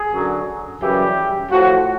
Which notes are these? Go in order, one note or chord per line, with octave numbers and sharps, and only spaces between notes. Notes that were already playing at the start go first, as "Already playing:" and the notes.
Already playing: G#4
F#2 D3 F#3
F#2 C#3 E3 G3 G4
A2 F3 F#4